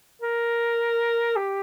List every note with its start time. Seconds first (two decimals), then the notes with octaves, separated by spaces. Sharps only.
0.22 A#4
1.36 G4